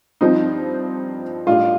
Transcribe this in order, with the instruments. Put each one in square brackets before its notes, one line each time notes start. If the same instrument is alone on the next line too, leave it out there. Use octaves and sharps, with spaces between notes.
[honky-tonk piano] G2 F3 C4 F4 C5 [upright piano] D#4
[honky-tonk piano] A1 A2 G3 D4 [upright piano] F4